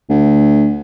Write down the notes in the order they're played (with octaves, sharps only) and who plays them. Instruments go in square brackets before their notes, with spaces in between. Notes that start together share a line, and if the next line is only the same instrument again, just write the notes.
[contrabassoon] D2